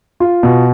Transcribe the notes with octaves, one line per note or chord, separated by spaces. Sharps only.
F4
B2